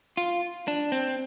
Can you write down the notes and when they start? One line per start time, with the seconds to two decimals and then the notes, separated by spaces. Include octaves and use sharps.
0.17 F4
0.68 D4
0.92 C4